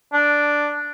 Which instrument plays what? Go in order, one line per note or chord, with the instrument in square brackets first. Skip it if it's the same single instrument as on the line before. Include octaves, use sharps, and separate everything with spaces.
[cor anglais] D4